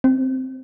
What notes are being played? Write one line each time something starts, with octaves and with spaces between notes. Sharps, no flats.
C4